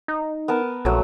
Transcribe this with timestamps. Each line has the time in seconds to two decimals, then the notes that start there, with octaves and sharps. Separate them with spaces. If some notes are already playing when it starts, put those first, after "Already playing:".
0.08 D#4
0.48 B3 A#4 A5
0.85 A#1 F#3 A3